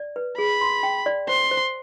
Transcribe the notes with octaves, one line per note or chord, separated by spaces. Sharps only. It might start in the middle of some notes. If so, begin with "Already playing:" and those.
Already playing: D5
B4
G#4 B5
C6
G5
D5
C5 C6
C5